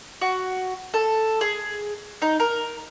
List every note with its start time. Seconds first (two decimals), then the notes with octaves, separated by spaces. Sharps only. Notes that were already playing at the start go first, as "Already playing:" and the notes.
0.21 F#4
0.94 A4
1.41 G#4
2.22 D#4
2.40 A#4